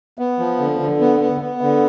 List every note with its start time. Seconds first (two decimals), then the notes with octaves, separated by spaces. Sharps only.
0.19 B3
0.39 F3
0.59 D3
0.80 D3
1.00 B3
1.20 B3
1.41 B3
1.61 D3